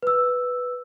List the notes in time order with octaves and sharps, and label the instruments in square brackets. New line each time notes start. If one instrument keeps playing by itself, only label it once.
[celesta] B4 E6